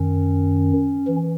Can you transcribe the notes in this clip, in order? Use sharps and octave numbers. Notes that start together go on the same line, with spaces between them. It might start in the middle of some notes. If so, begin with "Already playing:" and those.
Already playing: F#2 D#3 C#4
E3